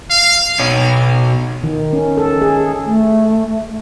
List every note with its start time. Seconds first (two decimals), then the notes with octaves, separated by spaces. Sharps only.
0.10 F5
0.59 B2 C#5
1.64 D#3
1.93 C#4
2.17 A4
2.42 G#4
2.85 A3